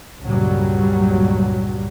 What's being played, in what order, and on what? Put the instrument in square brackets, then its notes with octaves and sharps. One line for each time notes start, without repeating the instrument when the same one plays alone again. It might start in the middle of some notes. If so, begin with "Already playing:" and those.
[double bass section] C#2 G2 A#2 F#3 G3